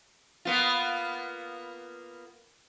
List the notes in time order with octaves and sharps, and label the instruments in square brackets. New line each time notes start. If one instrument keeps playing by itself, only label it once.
[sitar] A#3 B3 F4